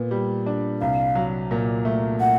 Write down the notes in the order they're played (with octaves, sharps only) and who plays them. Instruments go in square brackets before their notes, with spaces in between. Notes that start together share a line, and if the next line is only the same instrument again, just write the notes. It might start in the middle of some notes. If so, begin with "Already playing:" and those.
Already playing: [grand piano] A#2 B3
G3
D4
[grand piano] C2 [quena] F5
[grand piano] F#3
A#2
A3
[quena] F#5